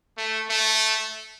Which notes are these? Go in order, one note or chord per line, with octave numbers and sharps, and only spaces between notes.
A3
A3